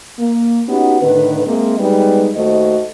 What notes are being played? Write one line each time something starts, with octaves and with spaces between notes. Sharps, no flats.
A#3
B3 C#4 D#4 F#4 G4
A2 D3 D#3 B4
G#3 A#3 C4 E4
G3 G#3 B3 D#4 B4
D#2 A3 F#4 C5 D#5